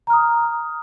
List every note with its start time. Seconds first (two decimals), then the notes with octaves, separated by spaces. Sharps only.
0.07 A#5
0.10 F6
0.13 D#6